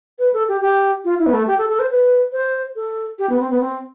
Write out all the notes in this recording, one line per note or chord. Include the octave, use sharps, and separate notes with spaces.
B4
A4
G4
G4
F4
E4
B3
A3
G4
A4
A4
C5
B4
C5
A4
G4
B3
C4
B3
C4